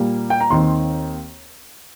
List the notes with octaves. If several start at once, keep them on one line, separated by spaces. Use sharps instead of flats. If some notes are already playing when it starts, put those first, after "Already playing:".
Already playing: A#2 G3 A#3
G5
A#5
D#2 D#3 C4 C6